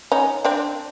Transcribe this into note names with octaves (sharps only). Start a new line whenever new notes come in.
C#4 D#4
C4 D4